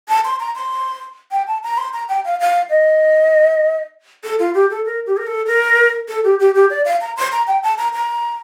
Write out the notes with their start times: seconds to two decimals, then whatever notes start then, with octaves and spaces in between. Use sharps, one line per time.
0.09 A5
0.25 C6
0.40 A#5
0.55 C6
1.31 G5
1.47 A5
1.63 A#5
1.78 C6
1.93 A#5
2.09 G5
2.25 F5
2.40 F5
2.70 D#5
4.24 A4
4.39 F4
4.54 G4
4.70 A4
4.85 A#4
5.06 G4
5.17 A#4
5.27 A4
5.47 A#4
6.09 A4
6.24 G4
6.40 G4
6.55 G4
6.70 D5
6.85 F5
7.01 A#5
7.17 C6
7.32 A#5
7.47 G5
7.63 A5
7.78 A#5
7.93 A#5